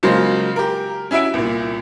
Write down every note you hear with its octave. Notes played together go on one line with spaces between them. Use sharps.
C#3 F#3 G#3 A#3 F4 C5
G4 A#4
C#4 E4 F#4 E5 D7
C2 A#2